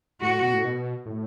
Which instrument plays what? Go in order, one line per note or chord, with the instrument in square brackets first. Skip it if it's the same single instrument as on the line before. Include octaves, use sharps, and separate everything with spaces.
[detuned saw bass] A2 [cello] F#4
[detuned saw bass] B2
A2
B2
A2